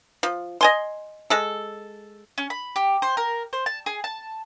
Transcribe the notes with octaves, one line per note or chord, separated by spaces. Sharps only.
F3
D#5 G#5 C6
G#3 A4
C#4
B5
G4
C5
A#4
C5
A5
G#4
A5